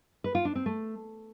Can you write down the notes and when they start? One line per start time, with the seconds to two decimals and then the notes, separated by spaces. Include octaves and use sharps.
0.24 B4
0.35 F4
0.45 D4
0.55 C4
0.66 A3